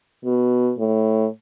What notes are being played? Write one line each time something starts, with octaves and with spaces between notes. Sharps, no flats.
B2
A2